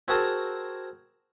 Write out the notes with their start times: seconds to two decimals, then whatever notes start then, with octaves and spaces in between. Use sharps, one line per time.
0.08 C4 F#4 G#4 A#4 A5 A#5